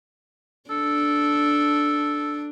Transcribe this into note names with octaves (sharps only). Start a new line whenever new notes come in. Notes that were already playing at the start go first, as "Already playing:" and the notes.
D4 A4